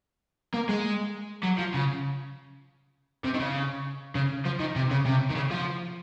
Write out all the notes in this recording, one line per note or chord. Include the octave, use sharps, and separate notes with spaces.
A#3
G#3
F#3
F3
C#3
C3
D#3
C#3
C#3
F3
D#3
C3
C#3
C3
D#3
C#3
F3